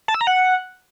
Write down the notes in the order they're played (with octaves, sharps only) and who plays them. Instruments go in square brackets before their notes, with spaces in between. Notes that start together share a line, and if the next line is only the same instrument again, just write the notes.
[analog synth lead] A5
E6
A#5
F#5